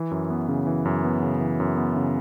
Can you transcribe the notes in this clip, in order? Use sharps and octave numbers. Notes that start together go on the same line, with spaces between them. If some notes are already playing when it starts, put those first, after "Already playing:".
Already playing: E3
F#2
B3
C#3
E3
F#2
B3
C#3
E3
F#2
B3
C#3